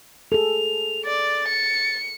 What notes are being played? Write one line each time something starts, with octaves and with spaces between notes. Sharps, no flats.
G#4 A4 F7
D5 A6
C#7